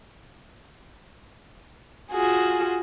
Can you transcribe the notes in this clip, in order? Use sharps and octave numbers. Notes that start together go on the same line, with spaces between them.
F4 F#4 G#4